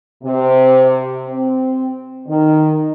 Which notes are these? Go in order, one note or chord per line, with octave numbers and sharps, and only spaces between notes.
C3
C4
D#3